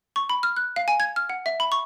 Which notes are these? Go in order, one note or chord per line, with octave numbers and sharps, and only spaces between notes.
C#6
B5
F6
F#6
F5
G#5
G#6
F6
F#5
E5
B5
C#6